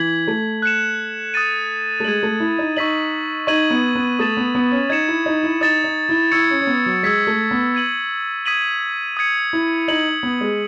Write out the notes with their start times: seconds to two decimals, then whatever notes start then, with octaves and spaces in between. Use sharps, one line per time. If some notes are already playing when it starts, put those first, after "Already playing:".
Already playing: E3 G#6 B6 F#7
0.27 A3
0.62 F#6 C#7 E7
1.34 D#6 F#6 A6 D#7
2.00 A3
2.04 G#3 G#6 D#7 F#7
2.23 A3
2.40 E4
2.59 D#4
2.76 D#4 C#6 E6 B6 F#7
3.47 D#4 C#6 G#6 D#7 F#7
3.70 B3
3.95 B3
4.19 A3 D#6 A6 E7
4.37 B3
4.55 B3
4.71 C#4
4.90 D#4 G#6 C#7 E7
5.08 E4
5.26 D#4
5.43 E4
5.61 D#4 D#6 A6 E7
5.84 D#4
6.09 E4
6.31 E4 C#6 E6 G#6 C#7
6.50 C#4
6.61 C#4
6.67 B3
6.86 F#3
7.03 G#3 E6 G#6 B6
7.27 A3
7.51 B3
7.75 G#6 D#7 F#7
8.46 D#6 G#6 B6 D#7 F#7
9.17 D#6 G#6 C#7
9.53 E4
9.88 D#4 G#6 C#7 F#7
10.23 B3
10.41 G#3